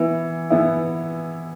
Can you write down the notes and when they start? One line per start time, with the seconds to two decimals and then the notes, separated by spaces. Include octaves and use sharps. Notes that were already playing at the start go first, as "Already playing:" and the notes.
Already playing: E3 B3 E4
0.50 E3 B3 E4